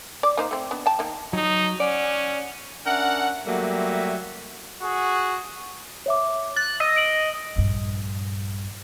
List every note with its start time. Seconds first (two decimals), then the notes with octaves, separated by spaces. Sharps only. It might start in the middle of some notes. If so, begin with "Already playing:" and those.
0.23 D5
0.37 A#3 D#4 C5
0.51 A3 C4
0.71 B3 D4
0.86 G5 A5
0.99 D#3 A#3
1.33 F#3 D#4 D#6
1.80 C#4 D5 F#5
2.86 C#4 D4 A#4 E5 F#5
3.46 F#3 G3 A3 A#3 G4 E5
4.81 F#4 G#4
6.06 C#5 E5 D6
6.56 F#6 A6
6.80 D#5 E6
6.96 D7 F#7
7.56 A#1 G2